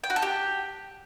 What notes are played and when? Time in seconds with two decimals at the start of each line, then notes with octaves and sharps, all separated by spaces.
0.04 G5
0.10 F#4
0.16 A4
0.22 G4